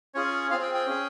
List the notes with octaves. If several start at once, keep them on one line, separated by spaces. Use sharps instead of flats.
C#4 F4 G#4 C#5
C4 F4 G#4 F5
G5
G5
C#4 G#4